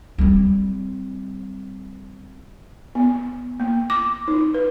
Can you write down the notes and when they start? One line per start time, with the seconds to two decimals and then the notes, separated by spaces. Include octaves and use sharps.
0.18 G3 C4
2.95 B3
3.60 A#3
3.90 D6
4.28 D#4
4.54 B4